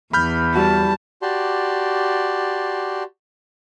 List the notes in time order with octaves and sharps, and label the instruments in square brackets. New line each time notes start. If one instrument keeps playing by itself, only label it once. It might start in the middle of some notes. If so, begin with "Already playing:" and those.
[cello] E2 [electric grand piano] B5 F6 G6
[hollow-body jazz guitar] G3 F#4 [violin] A5
[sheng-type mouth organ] F#4 G4 D5 A5 C6